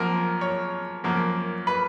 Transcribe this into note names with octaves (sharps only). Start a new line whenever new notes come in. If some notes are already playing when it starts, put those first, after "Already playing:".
Already playing: F#2 F3 A#3 A#4
C#5
F#2 F3 A#3
B4